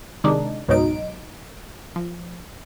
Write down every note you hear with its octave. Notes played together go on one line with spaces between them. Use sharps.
C3 D#3 G#3 D4 D#4
C#2 G#2 B2 F#3 D#4 D7
F3